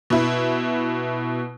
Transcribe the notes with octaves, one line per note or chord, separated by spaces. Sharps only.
B2 E4